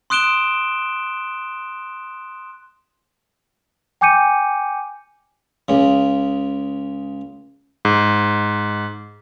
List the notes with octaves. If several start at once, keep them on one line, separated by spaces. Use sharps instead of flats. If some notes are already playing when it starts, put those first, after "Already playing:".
C6 D#6 F#6 D7 E7 G7
G5 G#5 D6 G6 C#7 D#7
C#2 C#3
G#2